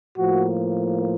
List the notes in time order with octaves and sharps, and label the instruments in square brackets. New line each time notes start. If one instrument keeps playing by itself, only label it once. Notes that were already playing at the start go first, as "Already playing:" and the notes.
[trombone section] A2 F3 A#3 F#4